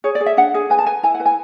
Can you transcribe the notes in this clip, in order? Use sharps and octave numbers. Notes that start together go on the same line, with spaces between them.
G#4 C#5
D5
G#4
E5
D4 F#5
G#4
B4 G#5
A5
B4 G#5
E4 G#5
F#5
B4
G#5